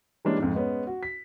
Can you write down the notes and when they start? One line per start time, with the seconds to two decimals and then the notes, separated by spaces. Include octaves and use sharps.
0.25 E3 G3 G#3 A#3 C#4 D4
0.38 F2 G#2
0.55 G#3 B3 C#4
0.87 F#4
1.03 B6